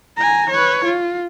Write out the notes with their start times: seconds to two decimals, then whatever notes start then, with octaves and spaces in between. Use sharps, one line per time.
0.17 G#5 A#5
0.50 B4 C#5
0.85 F4